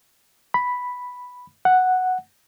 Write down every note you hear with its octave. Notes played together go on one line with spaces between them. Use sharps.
B5
F#5